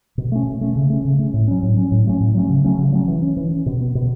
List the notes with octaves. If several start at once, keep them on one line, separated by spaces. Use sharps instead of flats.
B2
A3 C#4
B2
A3 C#4
C#3
A3 C#4
C#3
A3 C#4
A2
F#3 C#4
A2
F#3 C#4
A2
F#3 A3 C#4
A2
F#3 A3 C#4
C#3
F#3 A3 C#4
C#3
F#3 A3 C#4
E3
C#4
E3
C#4
B2
B3
B2